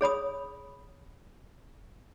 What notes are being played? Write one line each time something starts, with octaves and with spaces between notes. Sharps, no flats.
G#4 C#5 B5 D#6